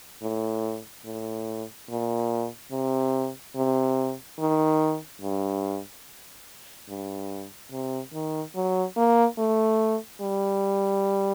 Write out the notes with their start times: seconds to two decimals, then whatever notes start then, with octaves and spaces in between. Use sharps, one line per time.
0.22 A2
1.05 A2
1.89 A#2
2.71 C3
3.55 C3
4.39 D#3
5.22 G2
6.89 G2
7.71 C3
8.13 D#3
8.55 F#3
8.97 A#3
9.38 A3
10.21 G3